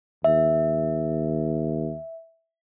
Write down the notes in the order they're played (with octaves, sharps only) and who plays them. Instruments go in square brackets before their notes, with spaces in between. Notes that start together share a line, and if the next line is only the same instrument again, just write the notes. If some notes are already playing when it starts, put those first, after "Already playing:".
[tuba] D#2 [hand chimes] E5